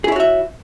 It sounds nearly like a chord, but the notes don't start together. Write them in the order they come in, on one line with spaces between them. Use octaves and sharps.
G#4 E4 C#5 F#4 E5